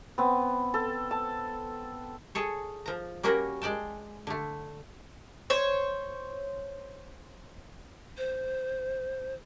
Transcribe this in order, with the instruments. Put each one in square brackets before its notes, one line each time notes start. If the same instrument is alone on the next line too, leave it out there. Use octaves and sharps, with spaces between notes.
[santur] B3 C4
A4
A5
[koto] G#4 A4 C#5
F3 A#5
G3 A#3 C#4 F#4 A#4
G#3 D5 G5 A5
D3 A3
[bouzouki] C5 C#5
[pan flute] C5